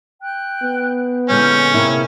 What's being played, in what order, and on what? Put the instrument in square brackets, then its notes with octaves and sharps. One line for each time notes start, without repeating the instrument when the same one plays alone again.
[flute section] G5 F#6
[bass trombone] B3
[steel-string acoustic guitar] A#2 D3 G#3 [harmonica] C#4 [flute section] E4 F6 G6
[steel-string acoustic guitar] C3 A#3 E4 [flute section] G#4 C#5